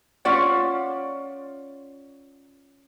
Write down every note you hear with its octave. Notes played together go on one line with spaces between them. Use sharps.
C#4 F4 D5 F#5